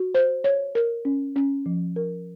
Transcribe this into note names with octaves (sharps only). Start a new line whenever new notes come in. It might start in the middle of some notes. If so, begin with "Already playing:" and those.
Already playing: F#4
C5
C#5
A#4
C#4
C#4
F3
A#4